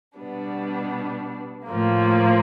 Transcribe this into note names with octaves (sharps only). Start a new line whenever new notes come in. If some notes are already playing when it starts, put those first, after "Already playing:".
B2 G3 B3 D4
A2 F3 A#3